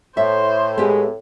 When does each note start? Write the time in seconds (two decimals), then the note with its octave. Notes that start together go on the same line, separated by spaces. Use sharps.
0.17 A2 C5 E5
0.78 G#3 B3 G4